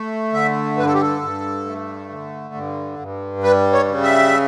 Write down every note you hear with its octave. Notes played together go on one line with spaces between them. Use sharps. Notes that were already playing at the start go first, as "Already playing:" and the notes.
Already playing: A3
D3 E5
G2 B4
A4
G4
A4
G2
A3
D3
G2
G2
G3 B4
C#5
C#3
E5